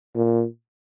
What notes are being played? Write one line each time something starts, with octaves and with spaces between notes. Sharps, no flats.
A#2